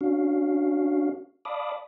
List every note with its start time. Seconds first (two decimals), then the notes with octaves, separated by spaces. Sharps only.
0.01 C#4 D4 F#4 F5
1.45 D5 F5 A5 B5 D6 D#6